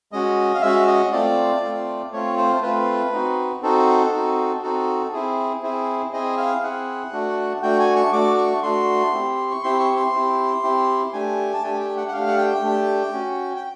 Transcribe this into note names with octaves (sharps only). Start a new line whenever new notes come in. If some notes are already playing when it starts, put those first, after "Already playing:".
G#3 C#4 F#4 D#5
F5
G#3 C#4 F#4 E5
D#5
A3 C4 F4 D5
A3 C4 F4
A3 C4 F4 C#5
C5
A3 C4 F4 B4
C4 D#4 F#4
C4 D#4 F#4 A4
C4 D#4 F#4
C4 D#4 F#4 A4
C4 E4 G#4
C4 E4 G#4
C4 E4 G#4 D#5
F5
C4 E4 G#4 F#5
A3 D4 F#4
A3 D4 F#4 G5
G#5
C#6
A3 D4 F#4 D6
C#6
A3 D4 F#4 C6
C4 E4 G4
C#6
C4 E4 G4 C6
C#6
C6
C4 E4 G4
C4 E4 G4
A3 D4 G4 G#5
A5
A3 D4 G4 G#5
G5
F#5
F#5
A3 D4 G4 F5
F#5
G5
A3 D4 G4
C#4 F#4
G5